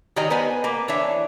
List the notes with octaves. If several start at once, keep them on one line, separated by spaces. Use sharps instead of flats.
D#3 G3 C#5 D#5 G#5 A#5
B3 B4 C5 G#5
A#3 B4
E3 D4 C#5 E5